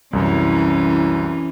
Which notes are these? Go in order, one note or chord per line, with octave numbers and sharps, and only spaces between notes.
C2 F#2 E3 C#4